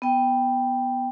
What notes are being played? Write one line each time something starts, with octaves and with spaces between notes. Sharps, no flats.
B3 G5